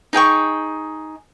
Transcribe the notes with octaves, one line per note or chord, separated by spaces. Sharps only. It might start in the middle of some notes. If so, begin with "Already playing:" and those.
D#4 G#4 G5 C#6